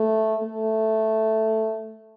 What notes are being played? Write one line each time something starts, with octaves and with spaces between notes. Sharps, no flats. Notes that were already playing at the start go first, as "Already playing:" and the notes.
Already playing: A3
A3